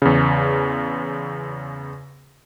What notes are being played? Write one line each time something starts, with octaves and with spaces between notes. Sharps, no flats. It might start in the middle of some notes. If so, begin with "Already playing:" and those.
E2 C#3